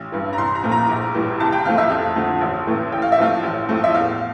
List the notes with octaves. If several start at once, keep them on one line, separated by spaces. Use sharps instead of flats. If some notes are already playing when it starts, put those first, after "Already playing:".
Already playing: A1
G2 E3
A#5
C2 C6
A#5
A#2 F3 A3
A#5
A#1
A2 E3 G3
C2 A5
G5
C3 F3 A3 F5
E5
F2
D3 F3 A3
A1
A2 E3 A3
A1 G5
F5
E5
A2 F3 A3 F5
A1
A2 F3 A3
E5
E2 F5